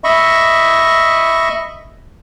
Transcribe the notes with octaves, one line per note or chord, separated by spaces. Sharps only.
D#5 E5 B5 C#6